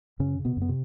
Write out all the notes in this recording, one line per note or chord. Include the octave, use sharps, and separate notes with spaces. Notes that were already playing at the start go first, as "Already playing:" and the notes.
F#2 C#3 C#4
C#3
B2 B3
F#2 B3
C3